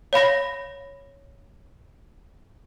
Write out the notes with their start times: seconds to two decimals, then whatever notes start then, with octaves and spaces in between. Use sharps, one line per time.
0.13 C#5 F5 B5 A#6